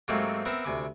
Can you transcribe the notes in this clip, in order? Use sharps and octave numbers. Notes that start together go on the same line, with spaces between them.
G#2 F#3 A3 A#3 C4 G4
B3 C4 A#4 E5
D2 C3 G#5 B5 D6